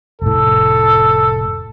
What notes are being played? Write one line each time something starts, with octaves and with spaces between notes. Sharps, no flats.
F1 A2 A4